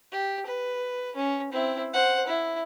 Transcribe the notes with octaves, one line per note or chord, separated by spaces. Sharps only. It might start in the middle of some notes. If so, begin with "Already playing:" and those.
G4
B4
C#4
C4 E4
C5 F#5
E4